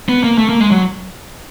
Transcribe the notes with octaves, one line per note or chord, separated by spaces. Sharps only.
B3
A#3
A3
A#3
G#3
F#3